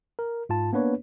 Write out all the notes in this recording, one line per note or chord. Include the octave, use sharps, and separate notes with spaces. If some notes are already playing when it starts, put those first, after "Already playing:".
A#4
G#2 F4 A5
A#3 B3 D4 B4 C#5